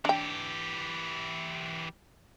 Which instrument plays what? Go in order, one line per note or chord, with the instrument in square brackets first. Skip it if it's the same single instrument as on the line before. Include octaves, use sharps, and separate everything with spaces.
[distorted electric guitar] E3 G4 [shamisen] D4 G5